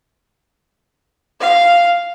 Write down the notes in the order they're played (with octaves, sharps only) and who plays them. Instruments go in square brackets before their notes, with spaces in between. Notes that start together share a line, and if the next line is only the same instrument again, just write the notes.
[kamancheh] F5